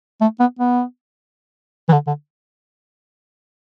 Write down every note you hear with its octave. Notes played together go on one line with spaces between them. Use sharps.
A3
B3
B3
E3
D3
D3